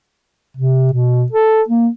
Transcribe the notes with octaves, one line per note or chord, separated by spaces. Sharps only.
C3
B2
A4
A#3